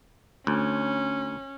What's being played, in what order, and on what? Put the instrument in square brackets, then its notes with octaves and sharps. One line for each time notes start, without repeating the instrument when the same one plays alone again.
[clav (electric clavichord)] D2 [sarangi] C#4